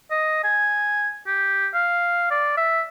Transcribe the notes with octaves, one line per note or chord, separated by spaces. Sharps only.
D#5
G#5
G4
F5
D5
E5